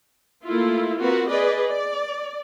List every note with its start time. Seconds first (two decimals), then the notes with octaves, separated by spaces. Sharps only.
0.44 A3 A#3 E4 F4
0.98 A#3 C4 F4 F#4 A#4 B4
1.27 G#4 B4 D5 D#5
1.68 D5